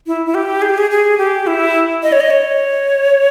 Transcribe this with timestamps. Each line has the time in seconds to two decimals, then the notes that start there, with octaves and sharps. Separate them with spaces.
0.07 E4
0.26 E4
0.34 G4
0.62 G#4
0.70 G4
0.78 G#4
0.91 G#4
1.18 G4
1.47 E4
2.03 D#5
2.12 C#5
2.20 D#5
2.30 C#5